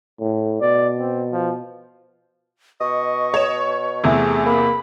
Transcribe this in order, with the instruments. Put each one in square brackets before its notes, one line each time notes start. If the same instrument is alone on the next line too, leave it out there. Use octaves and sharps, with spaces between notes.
[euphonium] A2
[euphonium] B2 [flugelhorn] D5
[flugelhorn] C4
F3
[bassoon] B2 [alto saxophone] D#5 [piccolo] C#6
[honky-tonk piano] C#5 E7
[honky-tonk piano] E2 C3 E4 [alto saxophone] A3 [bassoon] G#4
[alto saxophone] A#3 [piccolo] B5